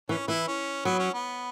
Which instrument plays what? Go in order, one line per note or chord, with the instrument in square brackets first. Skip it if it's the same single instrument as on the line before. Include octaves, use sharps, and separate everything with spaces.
[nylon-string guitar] E3 [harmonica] C#4
[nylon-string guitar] E3 [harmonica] E4
[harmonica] C#4
[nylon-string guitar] F#3 [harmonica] B3
[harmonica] C#4
B3